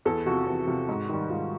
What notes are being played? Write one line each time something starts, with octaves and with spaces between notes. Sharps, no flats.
E2 A4
C3 F3 F#4
E2
C3 F3
G#2
D#3 G3
G#2 F4